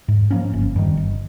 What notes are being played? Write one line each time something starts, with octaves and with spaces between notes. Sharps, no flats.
G#2
F3 A#3 C#4
G1
G2 D#3
G1